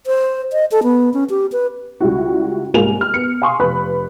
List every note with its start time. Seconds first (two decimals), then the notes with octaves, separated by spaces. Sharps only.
0.07 C5
0.53 D#5
0.72 A4
0.83 B3
1.14 C#4
1.30 G4
1.52 B4
2.00 C#2 G3 E4 F#4
2.74 C2 G#2 A#3 F4 G#5 F7
3.01 F6
3.14 B3 C#7
3.42 F5 G#5 C6 C#6 D#6
3.60 F1 B4 B5 F#6